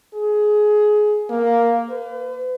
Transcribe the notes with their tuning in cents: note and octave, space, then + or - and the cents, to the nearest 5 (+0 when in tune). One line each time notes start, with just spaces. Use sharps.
G#4 +20
A#3 +5
B4 +40